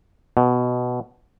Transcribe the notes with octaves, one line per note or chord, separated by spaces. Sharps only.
B2